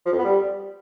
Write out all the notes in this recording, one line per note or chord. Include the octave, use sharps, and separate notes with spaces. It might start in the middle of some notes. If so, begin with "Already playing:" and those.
F3
F2
B3
G3